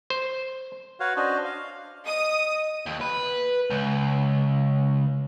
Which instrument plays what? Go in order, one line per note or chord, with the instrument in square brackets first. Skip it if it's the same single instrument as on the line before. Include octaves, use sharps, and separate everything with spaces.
[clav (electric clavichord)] C5
[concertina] F#4 B4 C#5 F5 F#5
C#4 D4 F#4 C5 D5 D#5
F5
[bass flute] D#5 [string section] D#6
[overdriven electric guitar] D#2
B4
C#2